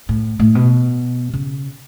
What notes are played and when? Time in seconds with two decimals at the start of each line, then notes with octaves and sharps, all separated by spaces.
0.09 A2
0.40 A2
0.55 B2
1.33 C#3